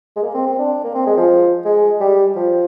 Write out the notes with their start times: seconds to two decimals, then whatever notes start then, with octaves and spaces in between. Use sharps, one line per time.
0.16 G#3
0.23 A#3
0.34 C4
0.46 C4
0.59 D4
0.84 A#3
0.94 C4
1.06 G#3
1.17 F3
1.65 G#3
2.01 G3
2.36 F3